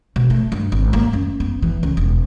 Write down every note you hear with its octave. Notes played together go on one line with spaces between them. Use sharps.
B2
A3
G2
G#1
A#3
F#2
B3
E3
C#2
E1